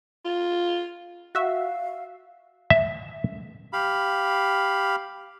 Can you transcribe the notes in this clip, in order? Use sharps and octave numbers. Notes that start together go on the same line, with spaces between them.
F4
F#4 E5 F5
E5
G4 F5 B5